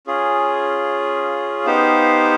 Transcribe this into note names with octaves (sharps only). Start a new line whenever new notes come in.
C#4 F4 G#4
B3 D#4 G4 C5 F5